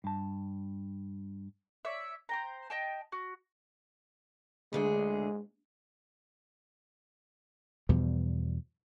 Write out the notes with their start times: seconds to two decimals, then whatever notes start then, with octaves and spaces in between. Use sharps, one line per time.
0.04 G2 A5
1.85 C#5 D5 E5
2.29 C5 G5 A#5
2.70 D#5 G5 A5
3.12 F#4
4.73 D2 D3 G#3 G#4
7.89 E2 B2 F3 G3